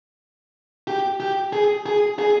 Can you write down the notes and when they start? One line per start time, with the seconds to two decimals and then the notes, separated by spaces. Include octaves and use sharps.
0.88 G4
1.20 G4
1.53 G#4
1.86 G#4
2.19 G#4